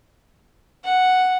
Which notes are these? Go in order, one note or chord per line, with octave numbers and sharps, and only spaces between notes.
F#5